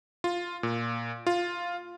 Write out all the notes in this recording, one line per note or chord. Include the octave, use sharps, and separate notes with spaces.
F4
A#2
F4